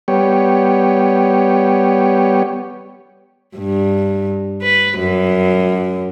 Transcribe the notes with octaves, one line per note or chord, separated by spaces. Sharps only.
G3 B3 G4 C#5
G2
B4
F#2